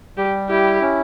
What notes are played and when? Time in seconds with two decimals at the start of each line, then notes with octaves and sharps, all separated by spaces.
0.17 G3 G4
0.49 E4 G4
0.81 C#4